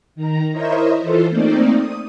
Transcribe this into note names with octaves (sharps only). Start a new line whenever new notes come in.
D#3 A#5
E4 A#4 C5 C#5 D#5 E5
E3 F4 A4 C5
A3 A#3 C4 D#4 D5
D#6